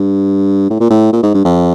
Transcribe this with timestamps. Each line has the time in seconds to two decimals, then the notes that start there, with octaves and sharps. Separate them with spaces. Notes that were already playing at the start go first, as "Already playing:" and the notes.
Already playing: G2
0.70 A2
0.80 A#2
0.90 A2
1.12 A#2
1.23 G#2
1.34 G2
1.45 F2